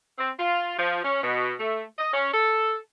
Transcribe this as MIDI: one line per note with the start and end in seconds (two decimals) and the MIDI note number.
0.18 0.30 60
0.38 0.74 65
0.78 1.00 53
1.04 1.21 61
1.22 1.53 47
1.59 1.83 57
1.99 2.11 75
2.13 2.30 61
2.33 2.76 69